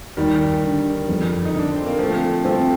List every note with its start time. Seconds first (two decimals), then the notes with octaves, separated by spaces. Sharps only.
0.17 D#2 D#3 G3
0.63 D3
1.09 F2
1.45 D#4
1.53 D3
1.59 D4
1.72 C4
1.86 A#3
1.99 F3 A3 C4
2.45 F3 A3 C4